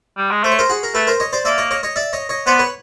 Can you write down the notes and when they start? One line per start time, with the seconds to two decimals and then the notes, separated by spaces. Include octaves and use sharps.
0.17 G3
0.31 G#3
0.44 A3 C5
0.52 C#5
0.59 A#4 C5
0.69 F#4 G#4
0.83 A#4
0.94 A3 A4 B4
1.07 A#4 C5
1.20 C#5 D#5
1.33 C5 D5
1.45 A#3 D5 E5
1.58 C#5 D#5
1.71 C#5 D#5
1.83 C#5 D#5
1.96 D5 E5
2.13 C#5 D#5
2.29 C#5 D#5
2.46 B3 C5 D5
2.59 B4 C#5